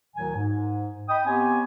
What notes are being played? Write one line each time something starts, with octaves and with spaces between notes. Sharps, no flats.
D2 A2 D#3 F#3 G#5
G#2
D#5 G5 B5 D#6
B3 C4 G4 C#5 G#5